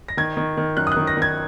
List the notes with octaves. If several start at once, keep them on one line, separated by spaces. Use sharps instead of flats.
A#6
D#3 G#6
D#3
D#3
F#2 F#6
D#6
D#3 F#6
A#6
D#3
G#6